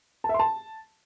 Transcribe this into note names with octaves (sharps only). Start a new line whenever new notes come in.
A5
E5
C6
A5